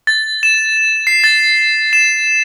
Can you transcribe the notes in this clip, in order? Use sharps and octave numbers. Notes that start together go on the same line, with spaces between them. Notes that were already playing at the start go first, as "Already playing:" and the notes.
A6
E7
C7
A6
E7